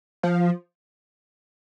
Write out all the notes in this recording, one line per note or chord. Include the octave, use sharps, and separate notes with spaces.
F3